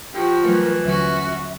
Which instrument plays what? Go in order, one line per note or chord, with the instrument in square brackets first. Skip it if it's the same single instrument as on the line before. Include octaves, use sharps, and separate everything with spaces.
[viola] F3 F#4 [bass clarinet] G4
[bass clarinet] E3 [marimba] F#3 G3 A3 [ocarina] A#4
[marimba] D#2 D3 F#3 [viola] C#4 F#4 [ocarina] E5